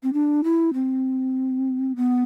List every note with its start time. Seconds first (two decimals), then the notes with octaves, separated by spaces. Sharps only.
0.03 C4
0.13 D4
0.44 E4
0.74 C4
1.96 B3